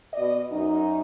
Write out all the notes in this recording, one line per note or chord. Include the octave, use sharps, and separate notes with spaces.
B2 D5 D#5
F#2 D#4